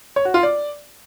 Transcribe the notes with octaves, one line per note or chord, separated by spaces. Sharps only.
C#5
F#4
F4
D5